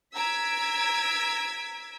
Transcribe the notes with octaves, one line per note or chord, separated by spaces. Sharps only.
A#5 E6 G#6 B6 D7